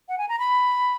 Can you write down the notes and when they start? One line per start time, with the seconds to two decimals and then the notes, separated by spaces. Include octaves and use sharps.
0.09 F#5
0.18 G#5
0.29 A#5
0.39 B5